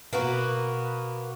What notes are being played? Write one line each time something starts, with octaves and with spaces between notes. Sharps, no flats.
B2 A#3 B3 F#4 B4